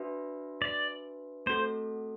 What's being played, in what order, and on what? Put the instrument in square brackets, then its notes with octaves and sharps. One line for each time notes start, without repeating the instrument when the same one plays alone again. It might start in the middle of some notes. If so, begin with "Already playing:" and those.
Already playing: [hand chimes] D4 F#4 B4 E5
[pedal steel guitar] D5
[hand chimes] A3 C4 F#4 A4 [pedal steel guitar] C5